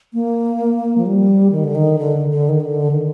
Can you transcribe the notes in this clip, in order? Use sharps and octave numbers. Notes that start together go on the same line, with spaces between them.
A#3
F3
G3
D#3
D3
D#3
D3
D3
D#3
D3
D#3